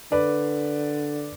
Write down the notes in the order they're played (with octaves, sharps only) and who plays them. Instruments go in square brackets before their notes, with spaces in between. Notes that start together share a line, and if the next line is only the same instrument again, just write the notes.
[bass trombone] D3 [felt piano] B4 D5